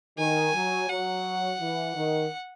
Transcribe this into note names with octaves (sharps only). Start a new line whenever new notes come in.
D#3 G#5
F#3
F#3 F#5
E3
D#3